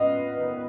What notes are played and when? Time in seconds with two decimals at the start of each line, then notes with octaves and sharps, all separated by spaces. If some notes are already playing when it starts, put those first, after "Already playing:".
Already playing: B3 F4 B4 D#5 F5
0.36 D#3